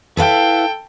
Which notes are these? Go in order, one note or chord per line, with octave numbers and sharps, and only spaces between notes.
E4 A4 B4 F5 G5